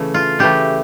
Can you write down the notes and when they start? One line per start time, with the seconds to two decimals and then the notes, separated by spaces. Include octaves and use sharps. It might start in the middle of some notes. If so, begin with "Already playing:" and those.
Already playing: C#3 E3 A3
0.14 F4
0.39 C#3 E3 A3 G4